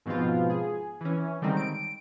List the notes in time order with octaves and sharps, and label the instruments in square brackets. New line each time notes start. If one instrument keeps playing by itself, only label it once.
[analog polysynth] G#2 B2 F3 B3 C4 F4
G#4
E3 C#4
D3 D#3 G3 G#3 C4 D#4
D7